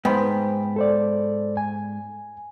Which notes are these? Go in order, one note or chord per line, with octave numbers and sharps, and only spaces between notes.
G#2 B3 C5 G5
A4 C5 D5
G#5